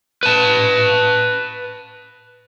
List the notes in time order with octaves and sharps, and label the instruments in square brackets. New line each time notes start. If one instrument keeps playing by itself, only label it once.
[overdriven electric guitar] B4 A5